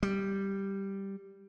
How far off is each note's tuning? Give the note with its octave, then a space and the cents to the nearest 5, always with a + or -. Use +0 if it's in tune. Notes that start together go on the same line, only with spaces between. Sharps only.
G3 +0